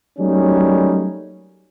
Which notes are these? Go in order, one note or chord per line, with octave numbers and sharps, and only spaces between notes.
F#3 G3 A3 A#3 C#4 D#4